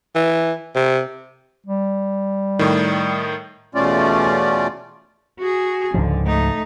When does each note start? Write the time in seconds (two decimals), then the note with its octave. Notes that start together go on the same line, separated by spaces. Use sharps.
0.15 E3
0.75 C3
1.67 G3
2.59 A2 D#3
3.75 E2 B2 A3 C#4 F4 D5
5.39 F#4 G#4
5.94 C#2 G#2 D3 F3
6.26 A3 D#4